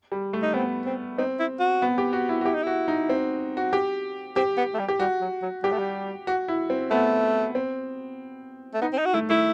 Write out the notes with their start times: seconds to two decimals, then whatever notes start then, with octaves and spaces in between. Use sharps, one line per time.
0.12 G3
0.33 A3
0.42 D#4
0.54 B3 C4
0.85 C4
1.17 C4 D#4
1.40 E4
1.60 F#4
1.82 B3
1.98 G4
2.13 F#4
2.29 E4
2.41 F#4
2.45 E4 G4
2.54 D#4
2.63 E4 F#4
2.88 D#4
3.09 C4
3.57 F#4
3.73 G4
4.36 C4 G4
4.57 B3
4.74 A3
4.79 G3
4.88 G4
5.00 G3 F#4
5.21 F#3
5.42 F#3
5.63 G3 G4
5.72 A3
5.79 G3
6.27 F#4
6.48 E4
6.70 C4
6.91 A3 B3
7.55 C4
8.74 A3
8.82 B3 D#4
8.93 C4
8.98 D#4
9.06 F#4
9.14 A3 E4
9.30 A3 E4